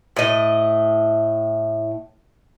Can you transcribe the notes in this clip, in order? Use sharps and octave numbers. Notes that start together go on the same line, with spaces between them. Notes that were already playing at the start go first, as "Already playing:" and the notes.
A2 D#5